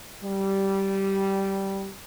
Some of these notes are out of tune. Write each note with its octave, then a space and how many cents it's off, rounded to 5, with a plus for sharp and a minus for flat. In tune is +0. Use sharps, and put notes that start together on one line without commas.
G3 -10